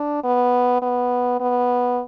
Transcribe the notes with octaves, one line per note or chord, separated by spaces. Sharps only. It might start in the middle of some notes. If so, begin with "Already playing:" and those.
Already playing: D4
B3
B3
B3